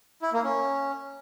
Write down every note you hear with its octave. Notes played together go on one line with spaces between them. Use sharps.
E4
A#3
C#4